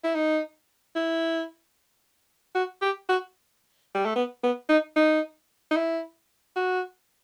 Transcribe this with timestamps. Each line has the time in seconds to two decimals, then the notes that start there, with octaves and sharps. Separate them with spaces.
0.04 E4
0.15 D#4
0.96 E4
2.55 F#4
2.82 G4
3.09 F#4
3.95 G3
4.06 A3
4.16 B3
4.43 B3
4.69 D#4
4.96 D#4
5.71 D#4
5.76 E4
6.56 F#4